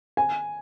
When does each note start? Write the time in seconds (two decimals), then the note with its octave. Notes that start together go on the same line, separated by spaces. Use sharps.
0.17 G#5